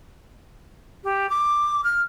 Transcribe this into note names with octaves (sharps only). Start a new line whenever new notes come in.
G4
D6
F6